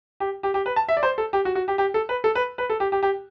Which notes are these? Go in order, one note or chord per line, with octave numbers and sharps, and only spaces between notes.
G4
G4
G4
B4
A5
E5
D5
C5
A4
G4
F#4
F#4
G4
G4
A4
B4
A4
B4
B4
A4
G4
G4
G4